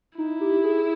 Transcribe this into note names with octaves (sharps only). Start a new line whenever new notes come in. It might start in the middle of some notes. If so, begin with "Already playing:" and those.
D#4 E4
G4
G#4